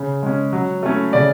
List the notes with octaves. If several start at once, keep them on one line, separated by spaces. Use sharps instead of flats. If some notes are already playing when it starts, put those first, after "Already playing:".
Already playing: C#3
G#3 C#4
F#3
A3 C#4 E4
C#3 D5